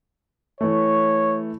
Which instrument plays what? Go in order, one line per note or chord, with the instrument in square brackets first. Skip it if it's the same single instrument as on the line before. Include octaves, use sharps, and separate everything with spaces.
[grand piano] E3 A3 [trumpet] C#5